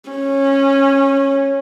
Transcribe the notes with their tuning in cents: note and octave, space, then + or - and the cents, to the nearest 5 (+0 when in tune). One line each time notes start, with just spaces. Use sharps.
C#4 -15